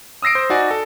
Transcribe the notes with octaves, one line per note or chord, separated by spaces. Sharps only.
D#6 E6 A#6 C7 D7
C5
D#4 F#4 D5 G#5
A4